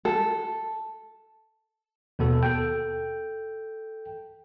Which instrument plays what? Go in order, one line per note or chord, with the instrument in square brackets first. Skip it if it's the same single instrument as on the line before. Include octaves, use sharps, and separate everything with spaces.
[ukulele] A4
[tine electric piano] D#2 B2 B3 A4
A4 G5